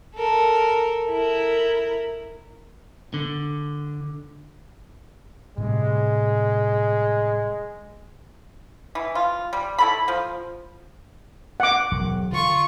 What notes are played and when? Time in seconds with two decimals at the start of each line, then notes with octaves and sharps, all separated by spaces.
0.15 A4 A#4
1.10 E4 A#4
3.14 D3
5.58 A2 C3 G3 G#3
8.95 E3
9.15 F4
9.53 G3
9.78 E4 A4 B5
10.08 F3
11.60 F#5 D6
11.92 E1 F#3
12.32 D3 F4 C#6